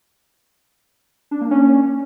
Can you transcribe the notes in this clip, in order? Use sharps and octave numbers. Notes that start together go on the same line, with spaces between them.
D4
A#3
C#4